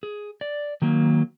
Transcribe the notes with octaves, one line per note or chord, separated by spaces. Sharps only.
G#4
D5
D#3 F#3 A#3